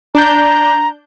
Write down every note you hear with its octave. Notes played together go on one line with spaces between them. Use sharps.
D4 A#5 G6